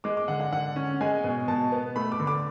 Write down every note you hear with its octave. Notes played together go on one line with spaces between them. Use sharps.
G#3 D6
D6
D3 F#5
F#5
D3 F#5
C#4
G#3 G#5
B2
B2 A5
B3
A3 B5
D6
D3
D6